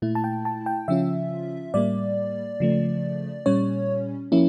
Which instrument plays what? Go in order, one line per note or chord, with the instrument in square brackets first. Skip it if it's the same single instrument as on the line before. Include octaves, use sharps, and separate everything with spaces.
[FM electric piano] A#2 A3 E4
A5
G5
A5
G5
C#3 F3 C#4 F4 E5
A2 G3 A#3 D5
C#3 F3 A3
A#2 G3 C#4 C#5
F3 A#3 C#4 E4